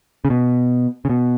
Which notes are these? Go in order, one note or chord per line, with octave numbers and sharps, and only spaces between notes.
C#3
B2
C#3
B2